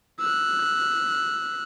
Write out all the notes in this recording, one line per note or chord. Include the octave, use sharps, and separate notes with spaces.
E6 F#6